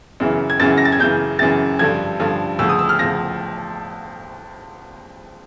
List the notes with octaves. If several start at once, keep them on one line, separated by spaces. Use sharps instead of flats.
F#2 C#3 E3
G#6
F#2 C#3 E3 A6
A#6
A6
G#6
F#2 C#3 E3 G6
F#2 C#3 E3 A6
G2 D3 F3 G#6
G2 D3 F3
D2 C#3 F3 E6
D#6
E6
F6
D2 C#3 F3 A#6